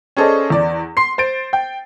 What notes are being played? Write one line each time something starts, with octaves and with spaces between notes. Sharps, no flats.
C#4 G#4 A4 C5 D5 D#5
E2 D5
C6 C7
C5 A6 D7
G5